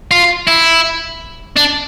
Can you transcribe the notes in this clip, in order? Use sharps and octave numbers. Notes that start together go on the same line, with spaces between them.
F4
E4
D4